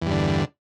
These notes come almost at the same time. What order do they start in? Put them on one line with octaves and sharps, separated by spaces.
E2 G2 D3